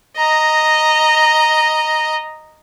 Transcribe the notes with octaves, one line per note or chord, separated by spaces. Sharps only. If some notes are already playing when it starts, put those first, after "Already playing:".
D#5 A#5